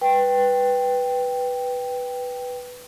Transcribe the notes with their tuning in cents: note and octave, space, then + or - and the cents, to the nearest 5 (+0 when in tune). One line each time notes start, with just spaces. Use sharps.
B4 +0 G5 +0